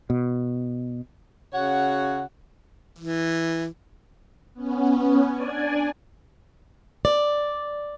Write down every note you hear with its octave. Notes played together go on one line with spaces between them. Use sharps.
B2
C#3 F#4 C#5 F#5
E3
B3 C#4
D4 D5 G#5
D5